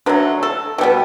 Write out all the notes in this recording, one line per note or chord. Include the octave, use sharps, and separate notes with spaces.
D3 F#3 A3 B4
A4
B2 G3 B3